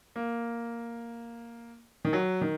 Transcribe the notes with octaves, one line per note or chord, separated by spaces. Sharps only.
A#3
D#3
F#3
D#3